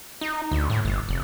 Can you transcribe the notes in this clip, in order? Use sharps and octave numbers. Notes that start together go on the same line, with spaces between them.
D#4
D2
A2
G1
F1